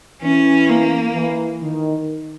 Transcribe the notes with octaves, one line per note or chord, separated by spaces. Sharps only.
E3 C#4
A#3
E3
D#3